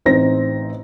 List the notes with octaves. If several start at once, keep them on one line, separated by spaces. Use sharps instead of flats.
A1 C4 D#4 C5 A#6